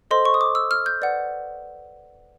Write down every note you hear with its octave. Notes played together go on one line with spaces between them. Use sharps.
A4 C5 D#5 C6
C#6
D#6
D6
E6
F6
G6
B4 D5 F#5